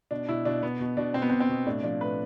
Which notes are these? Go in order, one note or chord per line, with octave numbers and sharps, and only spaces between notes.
B2 D4
B2 E4
B2 D4
B2 B3
B2
B2 D4
B2 C4
B3
B2 C4
C4
B2
A2 D4
F3 D4
A2 B4